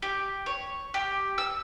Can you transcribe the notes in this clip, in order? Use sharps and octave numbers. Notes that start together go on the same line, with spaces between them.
G4
C#5
G4
E6